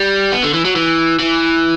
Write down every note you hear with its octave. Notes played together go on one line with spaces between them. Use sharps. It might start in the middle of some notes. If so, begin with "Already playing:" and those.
Already playing: G3
B3
D3
E3
F#3
E3
E3